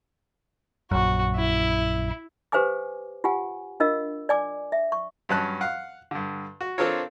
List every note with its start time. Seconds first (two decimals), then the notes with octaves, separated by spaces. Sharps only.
0.91 A#1 F#2 F#4
1.36 E4
2.52 G4 B4 C5 F5 G#5 D6
3.24 F4 G4 F#5 G#5
3.80 D4 F4 A#4 D#5 F5 E6
4.29 D5 G#5 D6
4.72 E5
4.92 C#6
5.29 G2 F#3 C#4 A5 F#6
5.61 F5 F#5
6.11 G2 D3
6.61 F#4
6.78 C4 D4 F4 A4 A#4 C#5